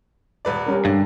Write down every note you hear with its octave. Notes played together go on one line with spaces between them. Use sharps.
D#1 B4 D5
G3 C#4 A#4
G2 D3